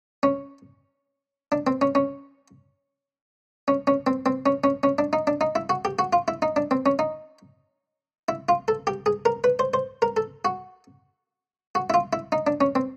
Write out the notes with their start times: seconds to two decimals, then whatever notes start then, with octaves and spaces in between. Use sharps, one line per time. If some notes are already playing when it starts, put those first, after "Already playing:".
0.23 C#4
1.52 D4
1.67 C4
1.81 C#4
1.95 C#4
3.68 C#4
3.87 C#4
4.07 C4
4.26 C4
4.46 C#4
4.64 C#4
4.83 C#4
4.98 D4
5.13 D#4
5.27 D4
5.41 D#4
5.55 E4
5.70 F#4
5.85 G4
5.99 F#4
6.13 F4
6.28 E4
6.42 D#4
6.56 D4
6.71 C4
6.86 C#4
6.99 D#4
8.29 E4
8.49 F4
8.68 A4
8.87 G4
9.06 G#4
9.25 A#4
9.44 B4
9.59 C5
9.74 C5
10.02 A#4
10.17 A4
10.45 F#4
11.75 F#4
11.90 E4
11.94 F4
12.13 E4
12.32 D#4
12.47 D4
12.61 C#4
12.75 C4